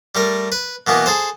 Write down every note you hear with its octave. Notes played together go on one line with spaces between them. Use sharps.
G3 A3 A#4
B4
B2 E3 A#3 B3
G#4 A4 C5